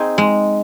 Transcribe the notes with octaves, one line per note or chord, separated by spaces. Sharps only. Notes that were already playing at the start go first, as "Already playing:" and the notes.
Already playing: C4 D#4 G#4
G#3